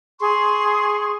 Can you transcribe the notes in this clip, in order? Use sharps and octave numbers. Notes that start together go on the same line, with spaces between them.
G#4 C6 C#6